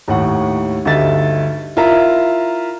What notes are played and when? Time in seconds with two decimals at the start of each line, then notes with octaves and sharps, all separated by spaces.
0.08 D#2 A2 F#5
0.85 D2 G2 D#4 E5 A6
1.76 E4 F4 A#4 E5 A#5